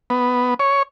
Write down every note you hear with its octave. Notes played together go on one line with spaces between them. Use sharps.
B3
C#5